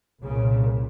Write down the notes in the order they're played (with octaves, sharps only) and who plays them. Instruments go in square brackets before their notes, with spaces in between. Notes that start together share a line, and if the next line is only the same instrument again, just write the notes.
[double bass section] C2 A#2 C#3